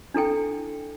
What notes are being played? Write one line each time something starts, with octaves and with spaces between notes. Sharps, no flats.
D4 E4 A4 G5